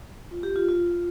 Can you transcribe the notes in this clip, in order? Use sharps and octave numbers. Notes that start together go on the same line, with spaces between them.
F4
G4
F4
F4